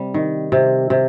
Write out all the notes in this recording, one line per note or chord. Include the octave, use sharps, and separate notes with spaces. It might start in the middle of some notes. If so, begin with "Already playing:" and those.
Already playing: C3 G3
D#3
C3
C3